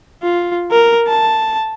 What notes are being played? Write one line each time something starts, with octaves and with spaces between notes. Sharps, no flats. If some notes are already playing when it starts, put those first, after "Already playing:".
F4
A#4
A5